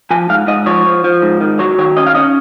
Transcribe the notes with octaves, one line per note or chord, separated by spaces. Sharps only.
F3 G#5
G#2 F5
G#2 D#5
F3 C#5
F3
F3
G#2
D#3
F#3 C#5
D#3 C#5
C#4 D#5
F5
C#4 D#5